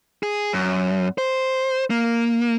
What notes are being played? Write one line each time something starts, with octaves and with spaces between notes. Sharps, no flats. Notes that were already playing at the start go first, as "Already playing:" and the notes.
G#4
F#2
C5
A#3